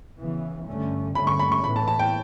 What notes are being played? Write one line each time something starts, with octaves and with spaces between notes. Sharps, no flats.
C#3 E3 B3
G2 D3 A3 C#4
G2 D3 A3 C#4 B5
C#6
B5
C#6
A2 E3 B3 B5
A5
A5
G5